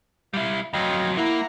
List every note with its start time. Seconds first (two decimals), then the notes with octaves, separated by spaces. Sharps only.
0.34 G3 E4 F5
0.73 F2 F#3 D#5 F5 G5
1.17 A#3 E4 E5 F#5 A#5